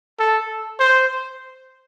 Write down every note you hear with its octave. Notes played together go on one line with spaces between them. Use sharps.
A4
C5